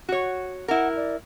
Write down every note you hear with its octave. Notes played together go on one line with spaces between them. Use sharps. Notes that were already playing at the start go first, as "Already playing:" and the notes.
F#4 C#5
E4 A#4 F#5
D5